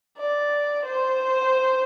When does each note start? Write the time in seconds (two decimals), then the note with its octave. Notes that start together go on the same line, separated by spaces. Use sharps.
0.18 D5
0.85 C5